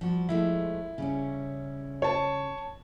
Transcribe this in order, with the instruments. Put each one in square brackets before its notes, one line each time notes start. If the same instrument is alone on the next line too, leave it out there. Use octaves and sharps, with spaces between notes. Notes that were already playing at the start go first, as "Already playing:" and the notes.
[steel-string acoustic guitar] F3 G3 F#4
[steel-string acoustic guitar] F3 G#3 A3 [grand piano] E4
[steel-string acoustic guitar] C#3 G3 C#4
[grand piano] C#5 A5